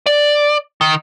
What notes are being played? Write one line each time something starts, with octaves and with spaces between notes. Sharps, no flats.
D5
D#3